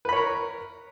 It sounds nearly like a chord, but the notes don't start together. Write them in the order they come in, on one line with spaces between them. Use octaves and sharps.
B4 B5 C#5 A#4